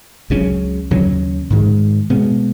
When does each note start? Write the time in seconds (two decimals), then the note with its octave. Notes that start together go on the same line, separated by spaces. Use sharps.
0.30 C#2 C#3 F#3 C#4
0.91 D#2 C#3 F#3 C#4
1.50 G#2 D#3 G#3
2.10 B2 G#3 B3